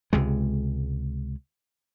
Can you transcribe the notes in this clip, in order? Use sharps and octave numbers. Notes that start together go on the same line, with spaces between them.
C#2 C3 G#3